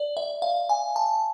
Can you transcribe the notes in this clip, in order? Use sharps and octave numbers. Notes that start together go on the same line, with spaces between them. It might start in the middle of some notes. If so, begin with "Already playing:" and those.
Already playing: D5
E5
F5
G#5
A5